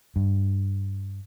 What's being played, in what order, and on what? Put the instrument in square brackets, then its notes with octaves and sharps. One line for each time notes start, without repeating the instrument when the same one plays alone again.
[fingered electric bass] G2